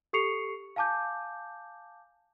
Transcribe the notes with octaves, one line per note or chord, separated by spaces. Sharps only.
G4 A4 C#6 C7 C#7 F7
F5 G#5 A5 D6 G6